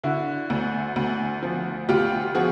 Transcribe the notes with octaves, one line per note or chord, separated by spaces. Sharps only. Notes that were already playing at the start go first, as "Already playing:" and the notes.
D3 E4 F#4
D2
D2
F3
D2 F4 G4
F3 F#4 G#4